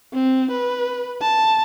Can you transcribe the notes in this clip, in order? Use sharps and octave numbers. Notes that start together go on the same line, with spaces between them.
C4
B4
A5